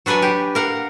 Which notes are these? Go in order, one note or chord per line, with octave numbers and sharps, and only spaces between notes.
F#3 D4 B4 F#5 G#5
G4
A#4 F5 F#5